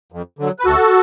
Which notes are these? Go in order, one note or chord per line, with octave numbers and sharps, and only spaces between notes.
F2
D3 F#3
B4
D2 F#4 A4